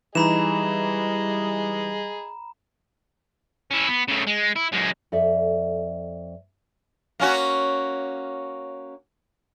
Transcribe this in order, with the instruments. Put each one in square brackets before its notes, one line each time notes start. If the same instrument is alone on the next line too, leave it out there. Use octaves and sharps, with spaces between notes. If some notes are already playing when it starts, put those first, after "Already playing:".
[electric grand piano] E3 D#4 [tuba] G3 [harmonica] G#4 D#5 [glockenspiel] A#5 B5 E7
[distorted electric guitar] C#4 E4
B3
C#3 A3
G#3
E4
F#2 G#3
[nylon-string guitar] F2 A4 D5 E5
[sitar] A#3 C#4 F#4